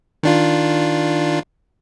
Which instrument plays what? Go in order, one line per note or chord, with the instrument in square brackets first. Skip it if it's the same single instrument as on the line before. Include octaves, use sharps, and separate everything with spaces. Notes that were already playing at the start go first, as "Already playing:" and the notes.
[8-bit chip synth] D#3 D4 F4